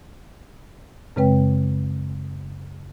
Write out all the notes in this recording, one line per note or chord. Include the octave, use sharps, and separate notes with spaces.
F#2 C#3 G#3 C4 B4 G5